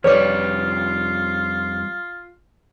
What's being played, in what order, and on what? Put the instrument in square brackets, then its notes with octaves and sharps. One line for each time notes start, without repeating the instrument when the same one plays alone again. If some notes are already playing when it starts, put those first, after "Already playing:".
[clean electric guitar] F2 G3 [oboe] F4 [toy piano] B4 D5 D6 [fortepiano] C#5